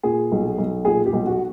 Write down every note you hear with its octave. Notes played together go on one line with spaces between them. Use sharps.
A#2 G#4
B1
B1
A#2 G#4
G4
B1
F#4